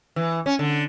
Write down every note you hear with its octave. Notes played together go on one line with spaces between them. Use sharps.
E3
C#4
D3